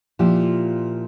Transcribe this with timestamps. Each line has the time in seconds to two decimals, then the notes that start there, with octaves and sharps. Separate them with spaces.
0.19 A#2 F3 E4 G4